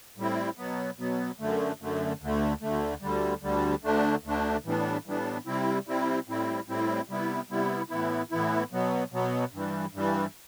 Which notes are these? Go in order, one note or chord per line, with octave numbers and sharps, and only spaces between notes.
A2 G3 C4 E4
B2 F#3 B3
B2 F#3 B3
F#2 D3 A3
F#2 D3 A3
D2 D3 A3
D2 D3 A3
D2 D3 G3
D2 D3 G3
D2 D3 A3 D4
D2 D3 A3 D4
A2 E3 G3 B3 D4
A2 E3 G3 B3 D4
C3 G3 C4 E4
C3 G3 C4 E4
A2 G3 C4 E4
A2 G3 C4 E4
C3 G3 B3 E4
C3 G3 B3 E4
A2 E3 B3 E4
A2 E3 B3 E4
B2 F#3 B3
B2 F#3 B3
G2 E3 G3
G2 E3 G3